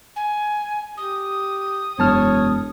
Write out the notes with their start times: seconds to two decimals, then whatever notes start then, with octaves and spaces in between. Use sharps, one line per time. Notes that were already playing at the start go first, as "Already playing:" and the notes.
0.16 G#5
0.97 G4 D#6
1.99 E1 F#2 C#5 A5 F6